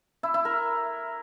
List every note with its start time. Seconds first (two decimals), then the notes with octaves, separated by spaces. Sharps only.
0.23 E4
0.34 E4
0.45 A#4